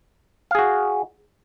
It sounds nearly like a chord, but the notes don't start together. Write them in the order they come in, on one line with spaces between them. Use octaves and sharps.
F5 G#4 F#4